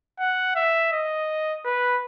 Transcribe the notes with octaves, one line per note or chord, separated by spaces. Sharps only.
F#5
E5
D#5
B4